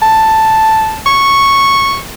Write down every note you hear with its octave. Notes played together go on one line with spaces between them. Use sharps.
A5
C#6